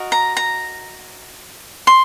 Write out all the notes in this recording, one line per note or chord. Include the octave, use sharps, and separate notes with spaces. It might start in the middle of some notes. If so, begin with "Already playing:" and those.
Already playing: F#4 A#4 D#5
A#5
A#5
C6